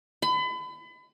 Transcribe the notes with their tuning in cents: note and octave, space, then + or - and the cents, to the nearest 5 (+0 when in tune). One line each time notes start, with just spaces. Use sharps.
B5 +35